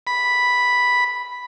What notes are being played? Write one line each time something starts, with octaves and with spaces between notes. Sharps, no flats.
B5